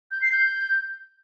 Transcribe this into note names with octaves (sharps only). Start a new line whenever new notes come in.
G6
C7
G6